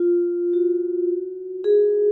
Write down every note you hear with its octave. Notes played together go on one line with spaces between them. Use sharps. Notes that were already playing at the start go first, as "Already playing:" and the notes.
Already playing: F4
F#4
G#4